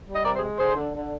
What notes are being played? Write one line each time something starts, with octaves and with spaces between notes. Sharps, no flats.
G3
D#5
C3 A#4 D5
G#4 C5
G#3
D3 G#4 C5
D3
D3